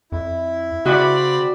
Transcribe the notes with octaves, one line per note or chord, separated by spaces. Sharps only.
F2 E4
C#3 C4 F#4 D5 B5